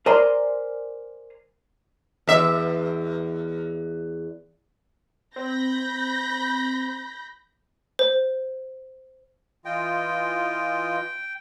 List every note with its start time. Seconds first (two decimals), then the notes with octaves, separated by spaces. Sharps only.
0.06 A#4 C5 D5 G#5 A#5 C6
2.27 E2 E5
5.36 C4 B5 G6 A#6
7.99 C5
9.65 E3 F4 D#5 G5